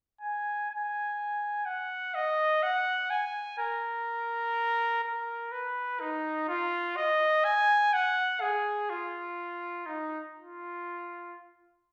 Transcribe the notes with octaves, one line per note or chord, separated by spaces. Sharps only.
G#5
G#5
F#5
D#5
F#5
G#5
A#4
A#4
B4
D#4
F4
D#5
G#5
F#5
G#4
F4
D#4
F4